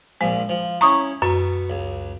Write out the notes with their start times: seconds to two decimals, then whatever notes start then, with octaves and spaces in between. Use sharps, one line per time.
0.21 A#1 F3 G#3
0.49 F3
0.81 C#4 E4 A#5 C#6 D#6
1.22 F#2 B2 C#6
1.70 C#2